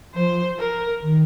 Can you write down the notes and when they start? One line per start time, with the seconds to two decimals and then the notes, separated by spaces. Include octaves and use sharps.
0.15 F3 C5
0.59 A#4
1.02 D#3